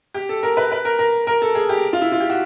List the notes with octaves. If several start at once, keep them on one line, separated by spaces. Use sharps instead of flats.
G4
A4
A#4
B4
B4
A#4
A#4
A#4
A4
G#4
G4
F4
E4
F4
G4
F#4